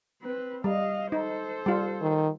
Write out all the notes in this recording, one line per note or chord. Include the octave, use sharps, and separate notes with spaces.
C4 B4
G3 D#5 F5
D#4 A4 C5
G3 F4
D#3